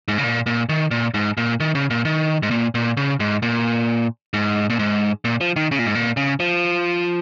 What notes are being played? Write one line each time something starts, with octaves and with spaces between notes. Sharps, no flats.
G#2
C#3
A#2
A#2
D#3
A#2
G#2
A#2
D#3
C#3
A#2
D#3
G#2
A#2
A#2
C#3
G#2
A#2
G#2
A#2
G#2
A#2
F3
D#3
C#3
A#2
G#2
A#2
C#3
F3